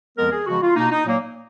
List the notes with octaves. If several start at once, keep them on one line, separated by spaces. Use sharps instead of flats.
F2 F3 G#3 B3 A#4
G#4
C#3 F3 G#3 B3 F#4
F4
B2 A#3 D#4
D#4
A#2 F#3 A#3